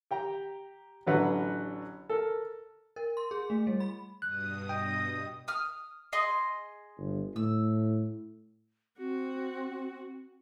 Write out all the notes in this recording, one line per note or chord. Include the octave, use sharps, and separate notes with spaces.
G4 G5 A#5
A1 D3 F#3 B4 F#5
A4 A#4
A#4
C6
G#4
A3
G3
B5
G2 B2 D#6 F#6
D#5 G5
D#6 F6
G#4 D#5 C6
G1
A2 E6
C4 F#4